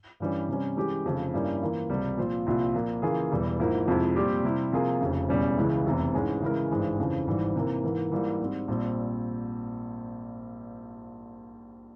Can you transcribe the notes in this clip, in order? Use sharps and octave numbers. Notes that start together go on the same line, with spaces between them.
G2 E3 G3 C#4
C3 G3 C#4
E3 G#3 C#4 G4
F1 F2 C#3 F3
G2 G3 A#3 C#4 E4
E3 A#3 F4
C#2 C3 G3
A#2 F3 C4 F4 C5
C2 A#2 F3 C4 F4
A#2 F3 A#3
C#3 E3 A#3 F4 G#4
E1 E2 E3 G3
G#1 G#2 F3 A#3 E4
F2 C3 F3 G#3 E4
A#2 G3 C4 G4
C3 G3 C4 E4
C3 F3 A#3 F4 G#4
F1 F2 C#3
E1 E2 C#3 G3 C#4
C#2 C#3 E3 G#3 E4
F1 E2 C3 E3
G#2 E3 G#3 C#4
C#3 E3 G#3 E4 A#4
G#1 G2 E3 G#3
F2 C#3 E3
G#1 G#2 E3 G3
C3 E3 A#3
G#2 E3 A#3
G#2 E3 G3 A#3 F4
G#2 G3 C4
A#1 A#2 G3 C4